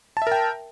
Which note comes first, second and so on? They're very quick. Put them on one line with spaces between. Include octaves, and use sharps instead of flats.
A5 E5 A#4 G5